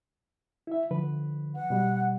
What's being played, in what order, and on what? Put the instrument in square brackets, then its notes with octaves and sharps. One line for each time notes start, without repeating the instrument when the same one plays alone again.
[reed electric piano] E4 E5
D3 F3 B4
[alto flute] F#5
[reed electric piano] B2 G3